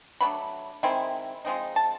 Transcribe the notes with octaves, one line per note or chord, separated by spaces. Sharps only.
B2 F#3 A3 D4 B5
D#3 G#3 C4 E4
F3 G#3 C4 D#4
A5